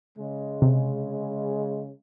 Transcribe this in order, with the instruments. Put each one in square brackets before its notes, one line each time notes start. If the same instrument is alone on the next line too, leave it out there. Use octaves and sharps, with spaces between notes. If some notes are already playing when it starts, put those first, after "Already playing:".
[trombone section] C#3 G#3
[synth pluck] C3